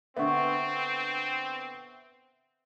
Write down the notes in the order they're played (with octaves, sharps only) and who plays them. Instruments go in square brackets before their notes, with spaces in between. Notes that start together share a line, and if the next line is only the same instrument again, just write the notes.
[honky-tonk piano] D3 B3 [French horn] C4 [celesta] E5 F#5 C#6